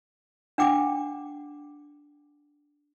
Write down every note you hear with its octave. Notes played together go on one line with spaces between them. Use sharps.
D4 F#5 G5 D6